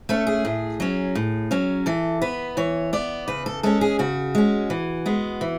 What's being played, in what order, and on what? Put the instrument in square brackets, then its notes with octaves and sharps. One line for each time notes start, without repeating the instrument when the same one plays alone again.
[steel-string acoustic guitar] A3 C#4 A4
G#4
A2
F#3 C#4
A2
F#3 C#4
E3 A4
B3 B4
E3 C#5
B3 D5
C#3 B4
A4
G#3 C#4 A4
G#4
C#3 F#4
G#3 C#4
E3
G#3 B3
E3